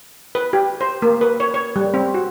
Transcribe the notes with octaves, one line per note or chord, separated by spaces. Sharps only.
B4
G4
C5
A#3
B4
C#5
C#5
G3
C4
F#4